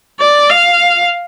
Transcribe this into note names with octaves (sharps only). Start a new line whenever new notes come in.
D5
F5